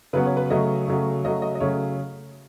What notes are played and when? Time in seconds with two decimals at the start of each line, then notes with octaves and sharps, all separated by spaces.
0.13 C#3 F#3 B3 B4
0.26 C#5
0.37 B4
0.50 C#3 F#3 A3 D#5
0.88 C#3 F#3 A3
1.24 C#3 F#3 A3 D#5
1.42 D#5
1.55 D#5
1.60 C#3 F#3 A3 C#5